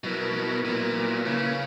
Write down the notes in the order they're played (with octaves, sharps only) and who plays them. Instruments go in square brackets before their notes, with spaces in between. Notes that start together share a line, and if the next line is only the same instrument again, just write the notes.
[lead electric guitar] B2 [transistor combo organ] F#3 B3 E4 A#4
[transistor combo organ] F#3 B3 E4 A#4
[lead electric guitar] A#2 [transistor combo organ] F#3 B3 E4 A#4
[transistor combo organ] F#3 B3 E4 A#4
[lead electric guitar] C#3 [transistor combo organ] A#3 C#4 E4 B4